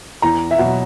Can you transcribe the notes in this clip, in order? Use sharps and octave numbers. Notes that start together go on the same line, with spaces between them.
E2 A#5
E5
B2 F#3 F#5